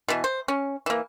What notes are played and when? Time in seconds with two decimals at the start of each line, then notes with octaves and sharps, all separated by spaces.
0.08 B2 E3
0.24 C5
0.48 C#4
0.86 E3 A#3